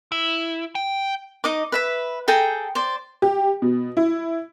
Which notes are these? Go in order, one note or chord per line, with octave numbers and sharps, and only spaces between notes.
E4
G5
D#4 D#5 D6
B4 E5 B5
G#4 A4 G5 A#5
C5 D5
G4
B2
E4